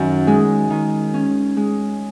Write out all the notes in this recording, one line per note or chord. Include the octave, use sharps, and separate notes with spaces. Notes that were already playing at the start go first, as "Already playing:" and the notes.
Already playing: F#2 D#3
G#3
D#3
C#4
G#3